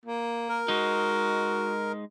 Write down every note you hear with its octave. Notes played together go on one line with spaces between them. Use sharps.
A#3
A#4
G#3 D#4 F#4